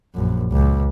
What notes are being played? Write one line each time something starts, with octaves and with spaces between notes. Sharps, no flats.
A#1 F#2
C#2